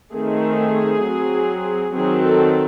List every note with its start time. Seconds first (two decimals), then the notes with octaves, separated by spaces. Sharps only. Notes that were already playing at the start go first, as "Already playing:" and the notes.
0.13 D#3 A3 C4 G#4
1.04 F#3 C4
1.95 D#3 F#3 C4 G#4
2.25 A4